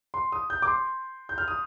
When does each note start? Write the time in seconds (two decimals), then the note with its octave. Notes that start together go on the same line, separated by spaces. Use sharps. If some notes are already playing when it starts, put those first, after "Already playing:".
0.14 C6
0.32 D#6
0.50 G6
0.62 D6
0.67 C6
1.29 G6
1.38 F6
1.48 D#6